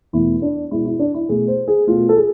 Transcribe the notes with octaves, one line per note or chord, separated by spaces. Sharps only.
E2 B2 A3 E4
D4
B2 G#3 E4
E4
D4
E4
B2 A3 G#4
C5
G#4
B2 A3 F4
A4
G#4